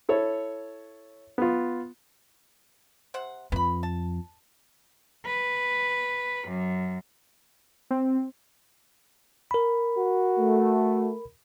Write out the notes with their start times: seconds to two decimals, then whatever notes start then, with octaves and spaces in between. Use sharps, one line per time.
0.09 E4 A4 C#5
1.38 B3 F4
3.14 C3 C5 F#5
3.52 F2 B4 B5
3.83 A5
5.24 B4
6.47 F#2
7.91 C4
9.51 A#4 B5
9.98 F#4
10.39 A3